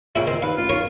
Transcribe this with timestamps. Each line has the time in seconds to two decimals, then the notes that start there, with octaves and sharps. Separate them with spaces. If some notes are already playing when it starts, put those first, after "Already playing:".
0.16 A#2 C#3 E4 E5 G5
0.27 D#3 C4
0.42 D#2 B4 F5
0.57 A1 F4
0.69 B1 A#4 C#5